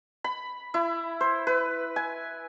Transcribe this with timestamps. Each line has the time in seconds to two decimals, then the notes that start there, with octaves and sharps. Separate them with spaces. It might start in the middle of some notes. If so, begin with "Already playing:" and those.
0.24 B5
0.74 E4
1.21 C5
1.47 B4
1.96 G#5